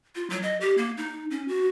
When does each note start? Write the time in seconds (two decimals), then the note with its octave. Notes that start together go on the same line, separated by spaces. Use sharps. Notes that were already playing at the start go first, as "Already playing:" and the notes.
0.15 F4
0.30 F#3
0.43 D#5
0.61 G4
0.77 A#3
0.97 D#4
1.30 C#4
1.48 F#4